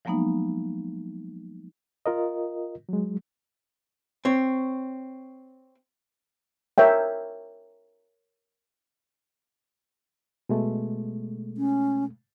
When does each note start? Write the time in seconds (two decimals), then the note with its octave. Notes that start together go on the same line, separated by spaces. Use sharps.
0.05 F3 F#3 G#3 A#3 B3 D#4
2.06 F4 A#4 D#5
2.89 F#3 G#3
4.25 C4 C#5
6.78 A#4 C#5 E5 G5
10.49 B2 G#3 A3
11.57 C#4